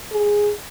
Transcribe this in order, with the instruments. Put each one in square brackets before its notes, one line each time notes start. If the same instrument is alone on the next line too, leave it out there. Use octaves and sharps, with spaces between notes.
[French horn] G#4